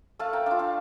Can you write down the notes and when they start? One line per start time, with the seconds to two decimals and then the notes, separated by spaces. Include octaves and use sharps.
0.19 A3 F5 A5
0.33 G5 A#5
0.46 D4 F4 F5 A5
0.59 F5 A5